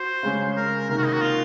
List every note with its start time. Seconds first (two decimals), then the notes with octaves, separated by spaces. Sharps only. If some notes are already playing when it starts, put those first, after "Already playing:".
Already playing: F#4 C5
0.23 C#3 G#3 C#4
0.57 A#4
0.89 C3 D#3 A#3 A#4
0.98 F#4
1.05 D#4
1.13 F#4
1.22 F4